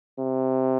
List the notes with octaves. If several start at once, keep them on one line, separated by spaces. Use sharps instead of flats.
C3